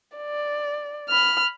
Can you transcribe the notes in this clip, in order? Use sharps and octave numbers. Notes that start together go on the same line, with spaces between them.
D5
B5 F6